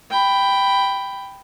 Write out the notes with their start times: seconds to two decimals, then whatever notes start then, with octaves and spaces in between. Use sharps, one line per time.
0.11 G5 B5